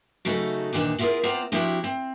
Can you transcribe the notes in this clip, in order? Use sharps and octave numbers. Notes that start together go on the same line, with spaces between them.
C#3 F#3 A3 D#4 A4
E2 A#2 D#3 A3 D4 D#4
B3 E4 F4 G4 G#4 A#4
B3 C4 F4 C5 D5 A#5
F3 C4 D4 E4 F#4 G4
C4